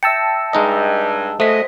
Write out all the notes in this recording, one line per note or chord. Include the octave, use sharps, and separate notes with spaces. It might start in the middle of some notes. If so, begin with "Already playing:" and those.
E5 G5 A5 E6 A#6 C#7
G2 G#3 D#4 D#5
F#3 G#3 A3 C5 D#5 B6